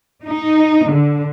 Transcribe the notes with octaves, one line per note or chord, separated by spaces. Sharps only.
D#4
D3